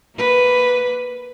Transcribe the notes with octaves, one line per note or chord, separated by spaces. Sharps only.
A#3 B4